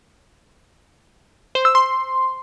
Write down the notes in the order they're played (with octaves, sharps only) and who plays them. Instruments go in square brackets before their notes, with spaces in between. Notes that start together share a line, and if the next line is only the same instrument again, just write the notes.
[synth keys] C5
E6
C6